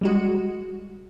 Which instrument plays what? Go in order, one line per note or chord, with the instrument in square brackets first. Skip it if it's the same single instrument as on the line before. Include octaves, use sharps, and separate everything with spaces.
[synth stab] G3 G#3 F#4